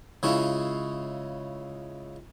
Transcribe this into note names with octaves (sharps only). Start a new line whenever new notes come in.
C#3 G#3 C#4 E4 F4